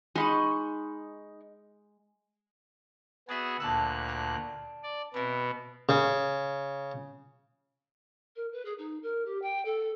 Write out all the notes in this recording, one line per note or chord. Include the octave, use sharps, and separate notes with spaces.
G#3 D#4 B5 C#6
B3 F#4 G#4 D5 E5
D2 A#2 A5 B5 E6 F#6
D4
D5
B2 B3 C4 E4
C#3
A#4
B4
G#4
D#4
A#4
G4
G5
A4